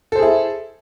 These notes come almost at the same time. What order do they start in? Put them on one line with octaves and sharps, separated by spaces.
A4 C5 G#4 E4